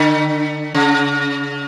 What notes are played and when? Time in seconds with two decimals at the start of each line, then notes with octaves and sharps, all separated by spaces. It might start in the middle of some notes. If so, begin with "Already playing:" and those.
Already playing: D3
0.74 C#3